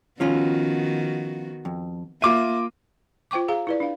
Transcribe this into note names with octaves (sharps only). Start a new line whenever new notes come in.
D#3 F3 B3 C#4 F4 F#4
F2
A#3 F4 E5 D6 D#7
F4 C5 G5 C#6 D6
G#4 F5 A#5
E4 B4 D5
D4 F5